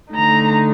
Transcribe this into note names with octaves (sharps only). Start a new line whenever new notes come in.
D3 A3 D#4 A#5